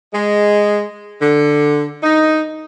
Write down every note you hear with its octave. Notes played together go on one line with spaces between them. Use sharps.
G#3
D3
D#4